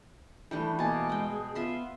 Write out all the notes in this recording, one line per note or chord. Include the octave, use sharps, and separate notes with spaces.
E3 G3 A3 D4 G5
B2 A#3 G#5 A5
G#3 D#5 G5
G#4
B3 F4 E5 C6